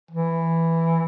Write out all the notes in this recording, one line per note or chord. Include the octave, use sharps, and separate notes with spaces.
E3